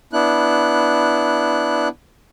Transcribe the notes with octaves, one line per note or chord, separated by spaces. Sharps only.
B3 D4 E4 F#6